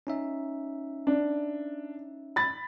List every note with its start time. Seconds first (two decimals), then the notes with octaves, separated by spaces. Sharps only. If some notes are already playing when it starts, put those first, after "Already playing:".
0.07 C#4 D#4 E5
1.07 D4
2.36 B5 A6